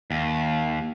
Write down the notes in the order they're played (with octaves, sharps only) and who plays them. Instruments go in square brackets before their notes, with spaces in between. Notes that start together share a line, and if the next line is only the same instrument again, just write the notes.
[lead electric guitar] D#2